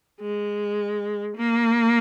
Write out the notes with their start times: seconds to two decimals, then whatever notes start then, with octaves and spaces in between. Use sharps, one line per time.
0.21 G#3
1.37 A#3